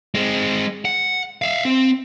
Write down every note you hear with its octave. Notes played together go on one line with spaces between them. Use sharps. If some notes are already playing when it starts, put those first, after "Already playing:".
G#3 C4
F#5
E5 F5
C4